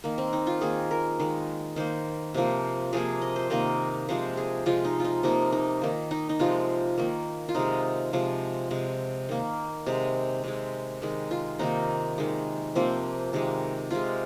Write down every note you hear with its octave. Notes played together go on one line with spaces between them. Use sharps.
D#3 A#3
C4
D#4
F4
D#3 A#3 G#4
A#4
D#3 G#3
D#3 A#3 C5
C3 F3 A#3
C3 F3 A#3 G#4
D#5
C5
C3 D#3 A#3 D#5
C3 F3 G#3 C5
G#4
C3 F3 G#3 F4
D#4
D#4 F4
C3 F3 A#3 D#4
D#4
D#3 A#3
D#4
D#4
C3 F3 G#3 F4
D#3 A#3
F4
C3 G#3 D#4
C3 F3 G#3
C3 G#3
D#3 A#3
C3 G#3
C3 G#3
D#3 G#3
F4
C3 D#3 A#3 D#4
D#3 G#3
C3 F3 A#3 C4
C3 D#3 G#3
C3 G#3 F4